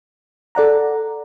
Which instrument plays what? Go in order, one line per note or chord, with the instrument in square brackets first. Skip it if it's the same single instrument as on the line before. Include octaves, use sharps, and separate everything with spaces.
[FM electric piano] A4 D5 F#5 A#5